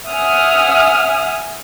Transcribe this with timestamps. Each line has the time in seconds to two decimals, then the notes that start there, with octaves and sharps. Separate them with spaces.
0.10 E5 F#5 G#5 D#6 F6